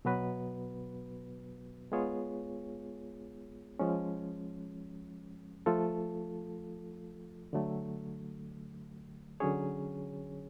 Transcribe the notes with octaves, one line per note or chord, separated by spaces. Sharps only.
B2 F#3 B3 F#4 B4
G#3 B3 F4 G#4 C#5
F3 G#3 C#4
F3 A3 F4 A4
D3 F#3 A3
D3 F#3 C#4 G#4 C#5